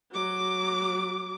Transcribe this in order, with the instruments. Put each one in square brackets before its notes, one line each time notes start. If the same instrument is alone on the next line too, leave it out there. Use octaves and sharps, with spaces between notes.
[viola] F#3 D6